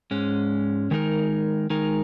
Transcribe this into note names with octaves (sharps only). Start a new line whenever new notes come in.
G#2 G#3 C#4
D#3 G#3 D#4 A#4
D#3 G#3 D#4 A#4